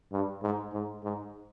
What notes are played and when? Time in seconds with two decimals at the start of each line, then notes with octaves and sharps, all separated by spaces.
0.12 G2
0.42 G#2
0.73 G#2
1.03 G#2